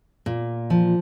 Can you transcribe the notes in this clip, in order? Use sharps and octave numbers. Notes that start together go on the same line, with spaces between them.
A#2
F3